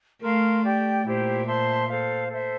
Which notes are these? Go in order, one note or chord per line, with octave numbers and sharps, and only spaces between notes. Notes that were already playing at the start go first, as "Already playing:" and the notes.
A3 A#4 F5 C6
G4 D5 G5
A#2 E4 G4 C5
C5 E5 A5 C6
A4 C5 F5
A4 C5 E5